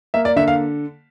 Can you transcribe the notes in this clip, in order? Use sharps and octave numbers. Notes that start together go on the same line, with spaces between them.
A#3 E5
D5
D3 E5
F5